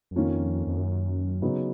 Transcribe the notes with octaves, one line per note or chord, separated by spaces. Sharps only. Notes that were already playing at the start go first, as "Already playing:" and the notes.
F#2
F2 D#3 A#3 C#4 F4
F2
F#2
G#2 C#3 F#3 B3 D#4